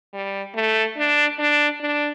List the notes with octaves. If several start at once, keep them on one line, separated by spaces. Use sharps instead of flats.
G3
A3
D4
D4
D4